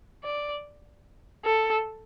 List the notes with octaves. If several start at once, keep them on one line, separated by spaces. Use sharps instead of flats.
D5
A4